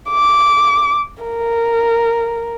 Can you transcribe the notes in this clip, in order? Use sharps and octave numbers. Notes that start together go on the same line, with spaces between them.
D6
A#4